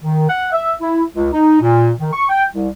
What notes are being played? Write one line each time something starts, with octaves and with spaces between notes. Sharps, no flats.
D#3
F#5
E5
E4
C#2
D#4
A#2
D#3
C#6
G5
C2